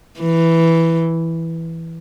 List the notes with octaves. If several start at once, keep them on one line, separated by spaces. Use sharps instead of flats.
E3